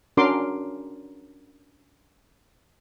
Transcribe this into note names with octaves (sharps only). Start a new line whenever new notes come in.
C#4 D4 F#4 A#4 C6 D6